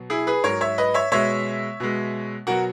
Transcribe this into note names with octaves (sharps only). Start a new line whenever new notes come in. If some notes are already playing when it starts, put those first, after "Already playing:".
Already playing: B2 F#3
E4 G#4
G#4 B4
G#2 F#3 A#4 C#5
C#5 E5
B4 D#5
C#5 E5
B2 G#3 C#5 E5
B2 G#3
B2 F#3 F#4 A#4